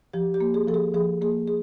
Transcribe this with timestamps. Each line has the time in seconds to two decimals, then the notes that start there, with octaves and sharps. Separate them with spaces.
0.13 F3 G4
0.34 G4
0.41 A#3
0.54 G#4
0.67 F3 A4
0.74 G#4
0.94 F3 G#4
1.21 A#3 G#4
1.48 G#4